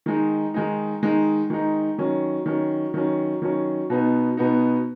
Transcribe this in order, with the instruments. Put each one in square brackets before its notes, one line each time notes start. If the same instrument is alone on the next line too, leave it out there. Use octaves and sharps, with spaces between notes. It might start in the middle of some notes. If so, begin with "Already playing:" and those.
[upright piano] D#3 G#3 D#4
D#3 G#3 D#4
D#3 G#3 D#4
D#3 G#3 D#4
D#3 F#3 C#4
D#3 F#3 C#4
D#3 F#3 C#4
D#3 F#3 C#4
B2 B3 D#4
B2 B3 D#4